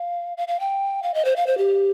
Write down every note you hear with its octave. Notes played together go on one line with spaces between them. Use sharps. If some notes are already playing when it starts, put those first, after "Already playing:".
Already playing: F5
F5
F5
G5
F5
D#5
C5
F5
C5
G4